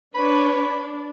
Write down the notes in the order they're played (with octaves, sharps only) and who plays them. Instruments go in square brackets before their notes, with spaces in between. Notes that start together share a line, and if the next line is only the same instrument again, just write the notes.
[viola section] D4 B4 C#5 [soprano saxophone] B5
[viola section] D4